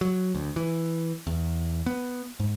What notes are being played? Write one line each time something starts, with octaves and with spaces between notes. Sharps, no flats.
F#3
D2
E3
E2
B3
G#2